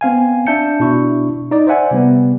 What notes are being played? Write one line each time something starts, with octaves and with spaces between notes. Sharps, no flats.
B3 C4 F5 G#5
D4 E5 A5 G6 C#7
B2 D4 E4 C#6
D#4 D5
C5 D5 E5 F#5 G#5
C3 G3 B3